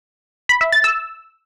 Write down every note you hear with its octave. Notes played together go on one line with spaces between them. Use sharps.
B5
E5
A6
E6